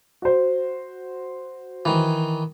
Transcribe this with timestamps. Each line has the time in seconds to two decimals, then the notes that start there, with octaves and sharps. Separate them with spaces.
0.22 F#4 C5
1.85 D#3 E3